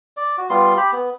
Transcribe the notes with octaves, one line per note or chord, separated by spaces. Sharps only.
D5
F#4
G3 B3 F4 C6
G4 B5
B3